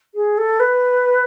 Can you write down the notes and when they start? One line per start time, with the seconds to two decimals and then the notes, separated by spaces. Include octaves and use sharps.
0.15 G#4
0.38 A4
0.60 B4